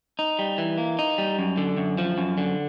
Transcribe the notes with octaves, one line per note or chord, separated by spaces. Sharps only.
D#4
G3
E3
A#3
D#4
G3
F#2
D3
F#2
F3
F#2
D3